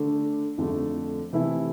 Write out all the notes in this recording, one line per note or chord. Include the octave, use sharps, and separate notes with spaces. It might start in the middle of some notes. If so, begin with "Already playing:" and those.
Already playing: D3 A3 D4
F2 D3 F3 A3
C3 E3 A3 E4 A4